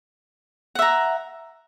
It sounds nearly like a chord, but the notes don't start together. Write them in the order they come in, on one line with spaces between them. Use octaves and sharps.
F#5 E5 A#5